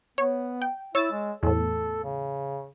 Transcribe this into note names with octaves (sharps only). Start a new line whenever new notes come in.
B3 C#5
G5
E4 C#5 E6 A6
G#3
E2 A2 A4
C#3